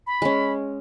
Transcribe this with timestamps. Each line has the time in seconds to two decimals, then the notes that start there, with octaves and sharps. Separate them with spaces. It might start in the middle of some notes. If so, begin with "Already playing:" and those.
0.07 B5
0.22 G#3 C#4